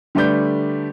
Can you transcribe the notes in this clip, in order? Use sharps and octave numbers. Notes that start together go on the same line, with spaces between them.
D3 G3 A3 B4 D5 G6